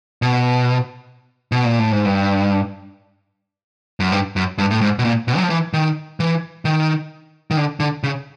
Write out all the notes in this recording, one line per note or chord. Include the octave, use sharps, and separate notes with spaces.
B2
B2
A#2
A2
G#2
G2
F#2
G2
F#2
G2
A2
G#2
B2
A#2
B2
F#3
F3
E3
D#3
E3
D#3
D#3
D3
D3
C#3